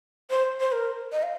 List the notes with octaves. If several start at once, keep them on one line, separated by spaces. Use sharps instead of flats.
C5
C5
A#4
D#5
F5